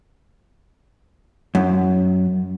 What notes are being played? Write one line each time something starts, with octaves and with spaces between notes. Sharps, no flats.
F#2